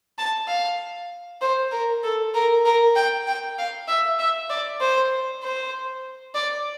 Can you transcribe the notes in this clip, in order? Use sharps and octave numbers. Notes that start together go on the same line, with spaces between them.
A5
F5
C5
A#4
A4
A#4
A#4
G5
G5
F5
E5
E5
D5
C5
C5
D5